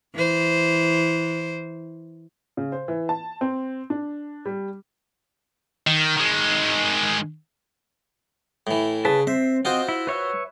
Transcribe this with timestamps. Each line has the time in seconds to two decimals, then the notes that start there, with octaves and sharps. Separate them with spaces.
0.15 E3 C5
2.57 C#3
2.72 C5
2.88 E3
3.09 A5
3.41 C4
3.90 D4
4.46 G3
5.87 D#3
6.17 D#3 G#3
8.67 A2 E3
9.05 C#3 B4 A5
9.27 C4 C5 E5
9.65 C4 F4 F#4 C5 D#5 G5
9.89 E4
10.07 B4 C#5 E5